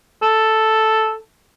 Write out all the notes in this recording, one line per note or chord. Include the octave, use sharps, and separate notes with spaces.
A4